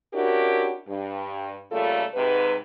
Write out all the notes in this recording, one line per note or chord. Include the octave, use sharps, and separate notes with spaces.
C#4 D4 E4 F#4 G4 A#4
G2
C#3 G3 A3 A#3 F4 A4
G#2 C3 B4